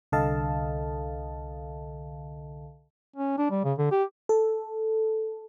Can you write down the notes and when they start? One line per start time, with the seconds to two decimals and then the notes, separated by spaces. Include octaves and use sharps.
0.12 C2 D3 A4 D#5 F5 A5
3.16 C#4
3.38 D4
3.50 G3
3.64 C#3
3.78 D3
3.91 G4
4.29 A4